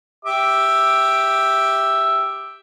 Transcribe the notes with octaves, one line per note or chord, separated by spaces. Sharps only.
G4 E5 D6